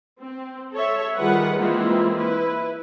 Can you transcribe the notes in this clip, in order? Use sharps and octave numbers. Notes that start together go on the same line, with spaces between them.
C4
A4 C#5 E5
D#3 G3 F4 G#4 B4 F#5
E3 G#3 A#3 C4 E4 F4
E4 B4